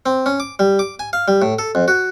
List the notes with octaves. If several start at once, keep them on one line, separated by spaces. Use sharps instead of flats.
C4
C#4
D6
G3
D6
G#5
F5
G3
A2
A4
F2
F#4